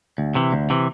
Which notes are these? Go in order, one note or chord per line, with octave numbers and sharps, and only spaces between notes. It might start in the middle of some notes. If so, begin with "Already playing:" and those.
D2
C3 E3
D2
C3 E3